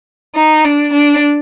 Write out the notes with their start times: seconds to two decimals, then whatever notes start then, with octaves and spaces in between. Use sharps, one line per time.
0.35 D#4
0.65 D4
0.93 D4